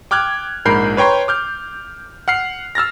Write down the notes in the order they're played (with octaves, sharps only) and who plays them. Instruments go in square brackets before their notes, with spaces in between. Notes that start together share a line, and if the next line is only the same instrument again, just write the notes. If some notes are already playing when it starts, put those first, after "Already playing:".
[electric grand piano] G5 D6 F6 F#6 G#6
A#1 G#2 A#4 B5 G6 C7
B4 C#5 G5 A#5 C6
D6 F6 G6
F#5 F6 C7
E6 F6 A6 A#6